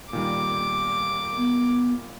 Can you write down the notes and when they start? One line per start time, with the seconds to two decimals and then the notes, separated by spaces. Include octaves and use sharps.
0.13 A#2 D#3 G3 D6
1.37 B3